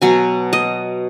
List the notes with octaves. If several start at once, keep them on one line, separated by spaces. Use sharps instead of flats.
B2 F#3 G#5
D#5